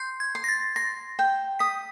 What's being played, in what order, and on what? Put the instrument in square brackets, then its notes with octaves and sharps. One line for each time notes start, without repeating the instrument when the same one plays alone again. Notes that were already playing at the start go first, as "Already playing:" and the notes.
Already playing: [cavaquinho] C6 [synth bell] G6
[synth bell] G#6
[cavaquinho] C6
[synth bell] A#6
A6
[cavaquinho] C6 [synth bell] A#6
[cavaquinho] G5
[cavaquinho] D#6 [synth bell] B6